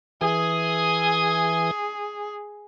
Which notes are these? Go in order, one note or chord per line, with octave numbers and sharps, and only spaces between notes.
E3 G#4 G#5 D#6